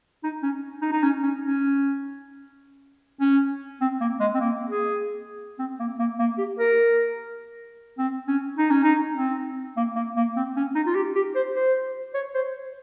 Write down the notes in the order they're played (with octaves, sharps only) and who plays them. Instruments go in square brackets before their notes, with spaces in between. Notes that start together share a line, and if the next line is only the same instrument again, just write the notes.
[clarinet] D#4
C#4
D#4
D#4
C#4
C#4
C#4
C#4
C4
A#3
G#3
C4
A#3
G#4
C4
A#3
A#3
A#3
G4
A#4
C4
C#4
D#4
C#4
D#4
C4
A#3
A#3
A#3
C4
C#4
D#4
F4
G4
G4
C5
C5
C#5
C5